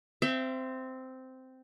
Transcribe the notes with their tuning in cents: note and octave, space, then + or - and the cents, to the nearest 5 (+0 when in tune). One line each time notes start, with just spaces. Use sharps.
C4 -10 E5 +30